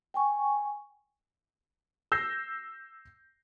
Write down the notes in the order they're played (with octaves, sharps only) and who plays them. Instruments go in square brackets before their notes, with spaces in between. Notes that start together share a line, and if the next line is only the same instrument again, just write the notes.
[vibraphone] G5 G#5 C#6
[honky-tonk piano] E6 G6 A#6 C7